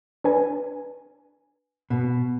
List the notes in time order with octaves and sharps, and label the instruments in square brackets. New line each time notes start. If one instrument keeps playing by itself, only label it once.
[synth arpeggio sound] D4 B4 G#5
[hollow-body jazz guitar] B2